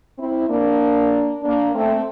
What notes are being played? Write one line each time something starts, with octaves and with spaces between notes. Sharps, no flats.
C4 E4
A#3 D4
A#3 D4
A3 C4